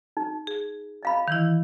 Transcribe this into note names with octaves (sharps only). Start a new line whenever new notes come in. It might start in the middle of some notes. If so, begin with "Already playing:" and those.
D#4
G#4
D#5 F5 B5
D#3 E3 E4